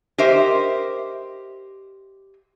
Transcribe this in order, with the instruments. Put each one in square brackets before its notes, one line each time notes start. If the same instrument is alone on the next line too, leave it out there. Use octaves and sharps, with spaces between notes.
[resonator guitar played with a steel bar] G4 A#4 C5 D#5 E5